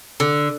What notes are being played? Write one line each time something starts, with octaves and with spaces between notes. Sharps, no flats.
D3